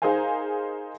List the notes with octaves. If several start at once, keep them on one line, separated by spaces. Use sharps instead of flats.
D#4 G#4 A#4 C5 F5 G#5